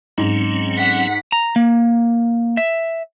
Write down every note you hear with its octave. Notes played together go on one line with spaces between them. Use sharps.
G#2 F#3 C4 C#4
F#5 B6
A#5
A#3
E5